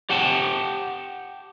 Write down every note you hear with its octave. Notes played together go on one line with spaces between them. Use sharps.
G4 F#5 G5 A5